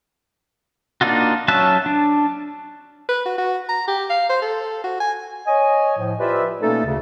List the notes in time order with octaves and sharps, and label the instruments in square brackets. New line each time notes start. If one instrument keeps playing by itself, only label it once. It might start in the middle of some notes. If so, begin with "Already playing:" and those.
[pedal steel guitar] A#3 D4 D#4 F4 F#4
F#3 C#4 E5 A5 F#6
D4
[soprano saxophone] B4
F#4
F#4
A#5
G4
F5
C5
A4
F#4
G#5
[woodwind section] C#5 D#5 G#5
A2 F3
F4 G4 B4 C5 D5 E5
B2 A3 A#3 C#4 D#4 A4
D2 C#3